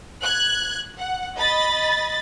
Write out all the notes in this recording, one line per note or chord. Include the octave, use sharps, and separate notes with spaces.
F#6 G#6
F#5
D#5 B5 A6